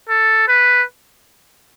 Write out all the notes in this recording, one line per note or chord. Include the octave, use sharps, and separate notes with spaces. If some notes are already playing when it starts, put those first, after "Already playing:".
A4
B4